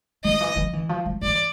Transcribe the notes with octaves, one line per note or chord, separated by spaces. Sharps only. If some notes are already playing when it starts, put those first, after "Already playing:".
D#3 D#5
E3
F3
E3
F3
F3
E3 D5